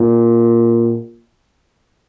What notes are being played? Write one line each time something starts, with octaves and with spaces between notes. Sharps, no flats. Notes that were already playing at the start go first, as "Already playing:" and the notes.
Already playing: A#2